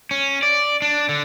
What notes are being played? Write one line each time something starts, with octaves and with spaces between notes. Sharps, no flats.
C#4
D5
D4
D3